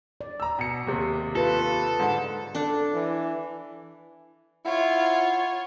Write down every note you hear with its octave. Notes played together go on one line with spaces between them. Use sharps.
D5
A#5 E6
B2 C#7
D#2 C3
F4 A4 B4
G#2 D3
D4 A4
E3
E4 F4 C#5 F#5